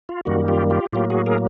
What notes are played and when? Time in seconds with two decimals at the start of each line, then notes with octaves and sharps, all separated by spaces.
0.09 F4
0.25 F#2 D#3 G3 A#3 F#4
0.48 F4 G4
0.70 F4 G4
0.93 A2 F#3 A#3 F4 G4
1.10 F#4 G#4
1.26 G#4 A#4